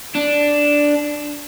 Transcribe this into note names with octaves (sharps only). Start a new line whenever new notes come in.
D4